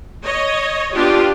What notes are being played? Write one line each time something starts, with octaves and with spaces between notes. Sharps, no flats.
C#5 D#5
B3 D4 F4 G4